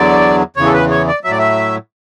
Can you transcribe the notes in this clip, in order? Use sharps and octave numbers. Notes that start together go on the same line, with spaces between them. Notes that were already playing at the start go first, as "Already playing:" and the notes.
Already playing: E2 D3 F#3 D5
E2 C#3 E3 C#5
A4
B4
C#5
D5
A2 F#3 D5 E5
E5